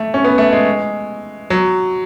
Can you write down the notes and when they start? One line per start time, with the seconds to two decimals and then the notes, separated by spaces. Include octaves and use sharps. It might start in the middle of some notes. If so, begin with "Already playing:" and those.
Already playing: A3
0.14 C#4
0.24 B3
0.38 A3
0.52 G#3
1.50 F#3